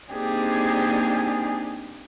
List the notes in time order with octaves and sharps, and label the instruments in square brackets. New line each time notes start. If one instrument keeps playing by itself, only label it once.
[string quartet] A#3 C4 D4 D#4 G4 G#4